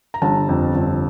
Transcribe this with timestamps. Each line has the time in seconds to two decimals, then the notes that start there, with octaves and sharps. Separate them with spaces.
0.14 A#5
0.22 G1 A5
0.49 F2
0.75 G1